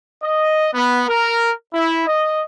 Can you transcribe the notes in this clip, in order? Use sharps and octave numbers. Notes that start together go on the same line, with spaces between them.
D#5
B3
A#4
E4
D#5